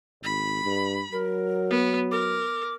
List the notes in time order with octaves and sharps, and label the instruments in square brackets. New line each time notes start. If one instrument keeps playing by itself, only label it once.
[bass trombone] G#1 [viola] B5
[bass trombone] G2
[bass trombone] F#3 [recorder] A#4
[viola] B3
[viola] A#4 [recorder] D6